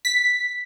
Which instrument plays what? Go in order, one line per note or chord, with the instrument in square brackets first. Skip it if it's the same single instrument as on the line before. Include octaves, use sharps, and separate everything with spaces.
[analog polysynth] B6